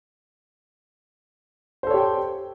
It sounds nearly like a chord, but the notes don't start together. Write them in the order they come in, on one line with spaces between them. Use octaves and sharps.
C5 A4 C#5 G4 G5